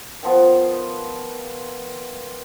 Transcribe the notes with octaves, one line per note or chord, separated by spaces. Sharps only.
D#3 F3 B3